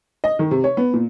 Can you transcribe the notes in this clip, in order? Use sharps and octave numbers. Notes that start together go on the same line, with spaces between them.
D#5
D#3
C3
C#5
B3
A#2